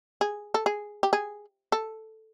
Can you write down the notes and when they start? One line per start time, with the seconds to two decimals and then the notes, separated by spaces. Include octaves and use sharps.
0.21 G#4
0.54 A4
0.66 G#4
1.03 G4
1.13 G#4
1.72 A4